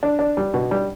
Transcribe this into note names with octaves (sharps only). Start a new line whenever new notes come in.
D4
D4
G3
B2
G3